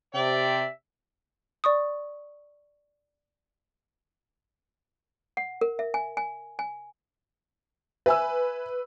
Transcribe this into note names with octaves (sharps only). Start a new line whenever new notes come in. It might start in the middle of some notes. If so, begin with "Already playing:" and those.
C3 D5 E5 G5
D5 C#6 D#6
F#5
A#4
E5
G#5
G#5
G#5
B4 E5 G#5 E6